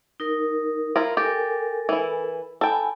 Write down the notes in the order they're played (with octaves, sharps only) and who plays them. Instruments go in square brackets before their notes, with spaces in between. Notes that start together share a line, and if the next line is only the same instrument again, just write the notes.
[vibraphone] D#4 A#4
[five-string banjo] E4 F4 A#4
[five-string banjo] G4 [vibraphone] A4 A#4 G#5
[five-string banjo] E3 E4
[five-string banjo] A4 G5 [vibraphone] G#5 B5